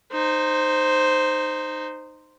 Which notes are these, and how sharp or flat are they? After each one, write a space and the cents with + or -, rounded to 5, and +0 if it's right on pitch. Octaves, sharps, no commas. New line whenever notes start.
D#4 -15 C5 +0